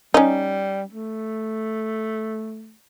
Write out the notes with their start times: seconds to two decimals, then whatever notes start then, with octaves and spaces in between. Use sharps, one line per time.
0.14 G3 C#4 D#4
0.93 A3